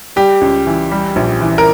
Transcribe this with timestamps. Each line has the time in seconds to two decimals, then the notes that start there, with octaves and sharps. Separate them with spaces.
0.16 G3 G4
0.41 C#2
0.66 E3
0.92 G3
1.16 A#1
1.41 E3
1.58 A#4